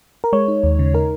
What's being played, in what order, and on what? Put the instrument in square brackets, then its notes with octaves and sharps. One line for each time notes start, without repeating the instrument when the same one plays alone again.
[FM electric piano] A#4
G#3 C#5
D#4
D#2
C#3
D#4 A#4